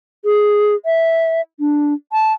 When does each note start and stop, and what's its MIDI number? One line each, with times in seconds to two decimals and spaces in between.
0.25 0.75 68
0.85 1.41 76
1.60 1.93 62
2.12 2.33 81